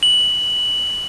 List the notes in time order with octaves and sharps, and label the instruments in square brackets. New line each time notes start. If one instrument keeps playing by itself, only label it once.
[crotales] F#7